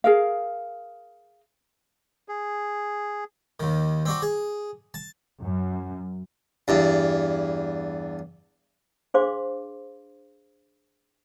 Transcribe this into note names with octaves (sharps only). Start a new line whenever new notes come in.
G#4 A#4 F5
G#4
D#2 D#3
C4 D4 F#4
G#4
A5
F#2
E2 G2
D4 G#4 C5 F5 C6 D6